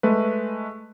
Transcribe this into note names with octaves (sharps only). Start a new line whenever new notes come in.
G#3 A3 B4